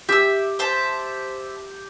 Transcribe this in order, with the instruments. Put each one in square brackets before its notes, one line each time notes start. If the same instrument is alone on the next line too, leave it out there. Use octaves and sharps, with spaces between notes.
[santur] G4 [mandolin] E5 E6
[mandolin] C5 E5 A5